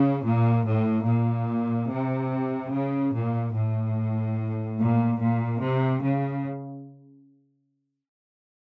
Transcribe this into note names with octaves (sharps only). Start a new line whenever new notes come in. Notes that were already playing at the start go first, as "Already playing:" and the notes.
Already playing: C#3
A#2
A2
A#2
C3
C#3
A#2
A2
A#2
A#2
C3
C#3